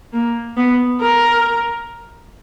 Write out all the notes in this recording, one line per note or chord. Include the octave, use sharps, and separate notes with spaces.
A#3
B3
A#4